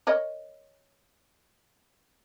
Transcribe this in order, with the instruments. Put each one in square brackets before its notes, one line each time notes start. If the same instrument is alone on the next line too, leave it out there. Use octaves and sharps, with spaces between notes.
[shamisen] A#4 C#5 D#5